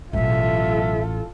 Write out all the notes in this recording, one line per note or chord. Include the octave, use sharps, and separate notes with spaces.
A1 B2 F#3 F4 A4 E5